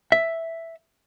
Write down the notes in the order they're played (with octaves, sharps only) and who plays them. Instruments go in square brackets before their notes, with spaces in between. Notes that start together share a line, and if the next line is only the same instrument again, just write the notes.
[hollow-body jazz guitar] E5